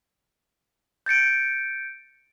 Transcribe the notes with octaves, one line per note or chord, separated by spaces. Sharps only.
G6 A6 C#7 D7